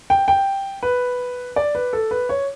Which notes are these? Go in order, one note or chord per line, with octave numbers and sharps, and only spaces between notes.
G5
G5
B4
D5
B4
A4
B4
C#5